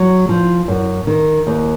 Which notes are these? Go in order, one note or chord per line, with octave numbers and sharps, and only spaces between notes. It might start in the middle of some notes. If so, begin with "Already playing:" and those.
Already playing: F#3
F3
F#2
D#3
D#2